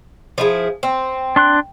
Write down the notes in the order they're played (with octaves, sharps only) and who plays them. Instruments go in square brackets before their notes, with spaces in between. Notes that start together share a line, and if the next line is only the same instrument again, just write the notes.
[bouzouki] F3 E4 G#4
C4
[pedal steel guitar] D4 C6 F#6